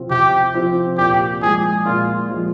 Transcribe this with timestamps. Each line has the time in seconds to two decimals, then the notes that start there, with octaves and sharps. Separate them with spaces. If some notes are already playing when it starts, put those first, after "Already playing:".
Already playing: C3 F3 C4 F4
0.10 C3 G4
0.54 F3 C4 F4
0.98 A#2 G4
1.42 F3 G#3 G#4
1.85 A#2 F4
2.29 F3 G#3